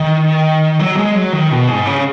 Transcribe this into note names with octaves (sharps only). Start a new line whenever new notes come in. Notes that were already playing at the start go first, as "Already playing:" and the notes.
Already playing: D#3
F#3
G#3
F#3
D#3
B2
G#2
C#3